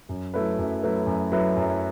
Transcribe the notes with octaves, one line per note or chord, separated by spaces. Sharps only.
F#2
F#3 A3 E4 B4
F#2
F#3 A3 E4 B4
F#2
F#3 A3 E4 B4
F#2